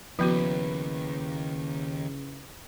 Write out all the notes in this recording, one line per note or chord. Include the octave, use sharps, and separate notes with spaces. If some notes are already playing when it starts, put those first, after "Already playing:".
D#2 C#3 F3 B3 E4 F#4 B4